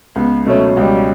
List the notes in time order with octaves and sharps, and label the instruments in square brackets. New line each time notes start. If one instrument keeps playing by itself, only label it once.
[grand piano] C#2 [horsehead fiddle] B3
[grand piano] B2 F#3 C#4 [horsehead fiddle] A3
[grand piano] C#2 [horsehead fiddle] G3